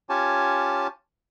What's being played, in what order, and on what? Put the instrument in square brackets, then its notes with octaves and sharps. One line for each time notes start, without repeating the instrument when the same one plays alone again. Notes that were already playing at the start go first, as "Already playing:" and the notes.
[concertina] C#4 F4 G4 C#5 G#5 A5